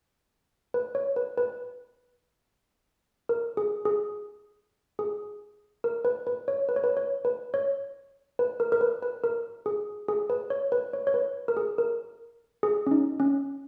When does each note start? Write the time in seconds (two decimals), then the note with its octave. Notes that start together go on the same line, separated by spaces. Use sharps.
0.74 B4
0.95 C#5
1.16 B4
1.38 B4
3.29 A#4
3.57 G#4
3.85 G#4
4.99 G#4
5.84 A#4
6.05 B4
6.27 B4
6.48 C#5
6.69 B4
6.76 C#5
6.84 B4
6.97 C#5
7.25 B4
7.54 C#5
8.39 B4
8.60 A#4
8.72 A#4
8.81 B4
9.03 B4
9.24 A#4
9.66 G#4
10.08 G#4
10.30 B4
10.50 C#5
10.72 B4
10.93 C#5
11.07 C#5
11.14 B4
11.48 A#4
11.57 G#4
11.78 A#4
12.63 G#4
12.87 C#4
12.91 D#4
13.20 C#4